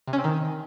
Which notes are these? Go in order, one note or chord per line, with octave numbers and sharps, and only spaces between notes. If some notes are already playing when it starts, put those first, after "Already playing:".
C3
C#4
C4
D#3